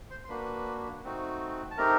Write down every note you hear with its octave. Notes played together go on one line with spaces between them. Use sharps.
C5 C6
C6
A#3 D4 F#4 B4 B5
A3 C4 D#4 F#4
A5
A3 C4 D#4 G4 A#4 A#5